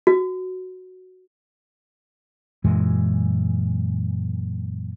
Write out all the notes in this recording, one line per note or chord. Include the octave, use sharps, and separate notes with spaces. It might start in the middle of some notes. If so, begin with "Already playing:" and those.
F#4
F#2 A#2 E3 G#3